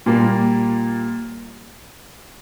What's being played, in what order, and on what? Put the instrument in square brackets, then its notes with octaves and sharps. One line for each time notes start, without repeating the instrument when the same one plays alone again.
[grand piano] A#2 G3 A#3